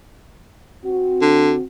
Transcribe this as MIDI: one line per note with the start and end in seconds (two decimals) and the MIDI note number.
0.85 1.62 60
0.85 1.62 66
1.22 1.53 50